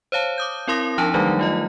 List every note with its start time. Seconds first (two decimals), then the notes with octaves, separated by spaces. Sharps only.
0.12 C5 C#5 F5 A5
0.38 D6 D#6 G6
0.67 C4 E4 A#4 C6 D#6 A#6
0.98 F3 D4 D#4 A5
1.14 D#3 F#3 G3 A3 D#4
1.39 A3 F4 D#5